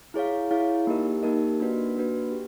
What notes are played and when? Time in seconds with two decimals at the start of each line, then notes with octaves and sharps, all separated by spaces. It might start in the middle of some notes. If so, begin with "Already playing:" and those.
0.14 E4 G#4 C#5 F5
0.51 E4 G#4 C#5 F5
0.87 A#3 D#4 G4 A#4 D#5
1.23 A#3 D#4 G4 A#4 D#5
1.60 A#3 D4 F#4 B4
1.96 A#3 D4 F#4 B4
2.32 G4